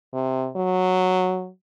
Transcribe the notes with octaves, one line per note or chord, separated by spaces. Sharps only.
C3
F#3